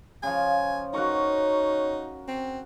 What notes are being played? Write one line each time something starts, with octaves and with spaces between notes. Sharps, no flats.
C#3 F3 G#5
D#4 F#4 A#4 C#5 C#6
C4